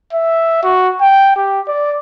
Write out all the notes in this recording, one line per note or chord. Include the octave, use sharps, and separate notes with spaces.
E5
F#4
G5
G4
D5